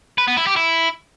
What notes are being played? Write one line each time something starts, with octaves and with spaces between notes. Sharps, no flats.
B4
B3
E4
G4
E4